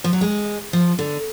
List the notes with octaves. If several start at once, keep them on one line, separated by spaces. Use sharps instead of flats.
F3
F#3
G#3
F3
D3